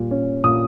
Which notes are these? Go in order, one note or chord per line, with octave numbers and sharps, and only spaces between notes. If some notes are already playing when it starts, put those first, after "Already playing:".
Already playing: A#2 G3
C#4
A#2 D#6